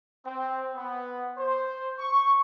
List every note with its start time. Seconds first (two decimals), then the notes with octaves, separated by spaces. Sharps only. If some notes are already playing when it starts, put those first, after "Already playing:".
0.25 C4
0.75 B3
1.38 C5
1.99 C#6